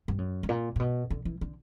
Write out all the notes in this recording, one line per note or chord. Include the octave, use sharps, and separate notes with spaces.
G2
F#2
G2
A#2
A#2
B2
D3
E3
D3